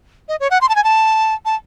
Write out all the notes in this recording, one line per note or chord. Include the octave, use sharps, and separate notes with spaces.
D#5
C#5
F#5
C6
A5
G#5
A5
A5